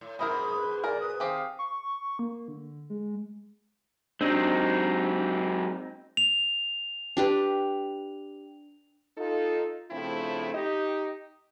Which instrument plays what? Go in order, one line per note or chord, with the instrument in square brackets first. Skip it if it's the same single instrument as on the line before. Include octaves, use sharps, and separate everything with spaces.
[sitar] A2
[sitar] F2 G#2 B2 [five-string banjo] G#3 E4 A#4 [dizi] B5 [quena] D#6
[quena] B4
[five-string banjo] G#4 A#4 [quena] D5
[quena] B4 [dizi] D#6
[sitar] D#3 [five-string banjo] C4 G4 G#4 [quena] F5
[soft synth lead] C#6
A#3
D3
G#3
[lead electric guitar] F#3 G#3 [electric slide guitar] C4 D#4 [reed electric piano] D4
[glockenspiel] F7
[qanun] D4 G4 B4
[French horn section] D#4 F4 A4
C#3 F3 A3 C4 D4 E4
D#4 G4 D#5